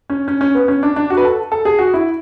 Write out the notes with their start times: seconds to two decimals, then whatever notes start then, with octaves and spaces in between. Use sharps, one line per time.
0.10 C#4
0.28 C#4
0.41 C#4
0.55 B3
0.68 C#4
0.83 D4
0.96 D4
1.10 F#4
1.17 B4
1.25 A4
1.52 A4
1.65 G#4
1.79 F#4
1.94 E4